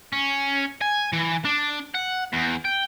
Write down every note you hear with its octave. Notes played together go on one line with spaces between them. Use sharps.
C#4
G#5
E3
D4
F#5
E2
G5